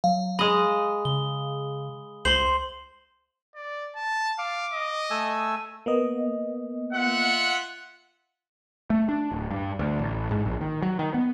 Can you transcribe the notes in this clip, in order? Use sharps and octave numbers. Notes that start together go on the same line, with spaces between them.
F#3 F5
G#3 D#5 B5 D#6
C#3 G7
C#2 C5 C6 F#7
D5
A5
F5 D6
D#5
A3 G#5 E6
A#3 B3 D#5
F4 E5 F#5
A3
D4
D1
G2
D2
A1
G#2
A#1
D#3
F#3
D#3
B3